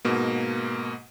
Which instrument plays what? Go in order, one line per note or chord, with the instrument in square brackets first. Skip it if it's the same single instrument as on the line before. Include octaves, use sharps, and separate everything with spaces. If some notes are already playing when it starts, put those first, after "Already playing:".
[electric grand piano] G#2 B2 A#3